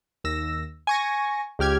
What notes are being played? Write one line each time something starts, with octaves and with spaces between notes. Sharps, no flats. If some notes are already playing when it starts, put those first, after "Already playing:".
D#2 E6 A#6
G#5 C#6 A#6
C#2 G4 F6 G#6